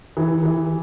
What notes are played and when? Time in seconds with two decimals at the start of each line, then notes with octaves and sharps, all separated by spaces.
0.17 E3
0.43 E3